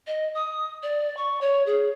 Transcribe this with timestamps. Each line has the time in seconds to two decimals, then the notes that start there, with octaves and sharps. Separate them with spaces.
0.07 D#5
0.35 D#6
0.83 D5
1.17 C#6
1.41 C#5
1.66 G#4